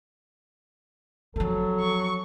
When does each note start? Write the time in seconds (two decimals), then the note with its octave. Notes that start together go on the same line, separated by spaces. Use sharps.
1.36 F3 F#3 C4 A4
1.80 C#6